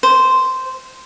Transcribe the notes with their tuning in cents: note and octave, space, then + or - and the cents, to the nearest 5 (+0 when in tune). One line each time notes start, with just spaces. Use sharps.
C5 -10